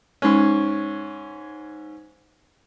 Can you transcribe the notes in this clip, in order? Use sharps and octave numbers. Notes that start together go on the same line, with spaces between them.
G#2 C#4